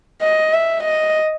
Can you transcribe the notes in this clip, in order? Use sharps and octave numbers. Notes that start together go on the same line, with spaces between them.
D#5
E5
D#5